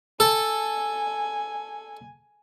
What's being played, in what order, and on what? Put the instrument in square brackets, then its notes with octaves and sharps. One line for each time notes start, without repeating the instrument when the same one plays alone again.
[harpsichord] A4 [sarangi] G#5